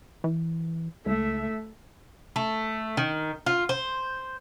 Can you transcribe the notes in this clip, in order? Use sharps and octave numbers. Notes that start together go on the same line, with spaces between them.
E3
C#2 A3 E5
A3
D#3
F4
C5